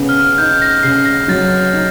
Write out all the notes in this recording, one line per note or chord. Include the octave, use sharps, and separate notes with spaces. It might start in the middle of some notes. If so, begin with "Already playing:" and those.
Already playing: C#3 B3
F6
D#4 G6
A#6
C#3 C7
A#6
F#3 A6
D#4